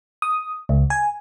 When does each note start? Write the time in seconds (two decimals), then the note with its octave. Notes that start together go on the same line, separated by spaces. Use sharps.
0.22 D#6
0.69 C#2
0.90 G#5